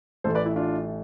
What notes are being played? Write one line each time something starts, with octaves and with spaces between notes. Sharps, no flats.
A1 A2 E3 A3 A4 C5
B4 D5
E4
D4 F4